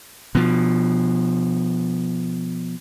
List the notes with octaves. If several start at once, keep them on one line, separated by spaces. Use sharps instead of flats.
B2 F3